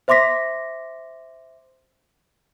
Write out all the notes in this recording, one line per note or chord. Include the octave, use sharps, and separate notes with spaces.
C5 E5 C6 D6 A#6 B6